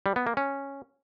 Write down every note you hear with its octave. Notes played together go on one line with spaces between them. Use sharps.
G3
B3
A#3
C#4